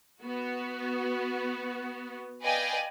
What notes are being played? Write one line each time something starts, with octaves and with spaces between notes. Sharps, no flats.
B3 F#4
B4 D5 D#5 F5 G5 G#5